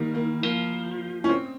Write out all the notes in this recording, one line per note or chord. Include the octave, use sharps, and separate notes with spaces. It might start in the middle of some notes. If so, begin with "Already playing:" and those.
Already playing: D#3 G3 A#3
A#3
F3 A#3
C#4
C4